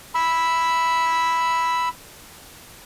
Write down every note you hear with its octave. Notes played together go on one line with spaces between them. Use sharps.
B5 E6